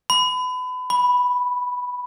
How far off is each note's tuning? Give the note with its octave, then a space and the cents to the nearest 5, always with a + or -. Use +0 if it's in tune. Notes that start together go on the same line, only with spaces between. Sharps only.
B5 +30
B5 -5